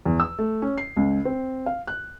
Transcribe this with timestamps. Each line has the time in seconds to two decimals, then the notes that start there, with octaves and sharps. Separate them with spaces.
0.06 E2
0.20 E6
0.39 A3
0.62 C#4
0.78 C7
0.97 C#2
1.25 C4
1.66 F5
1.87 F#6